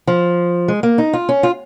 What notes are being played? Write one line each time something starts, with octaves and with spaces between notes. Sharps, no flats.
F3
G#3
A#3
D#4
F4
C#4
F4